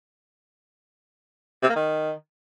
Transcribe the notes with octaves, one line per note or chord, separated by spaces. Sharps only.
C3
A#3
D#3